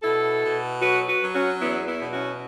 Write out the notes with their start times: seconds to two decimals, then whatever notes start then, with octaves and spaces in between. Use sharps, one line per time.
0.03 B2 E4 A4
0.43 B2
0.82 F#3 F#4 B4
1.08 F#4 B4
1.22 F#3
1.35 C#4 F#4
1.62 E2 B3 E4
1.88 B3 E4
2.00 B2
2.13 C#4 F#4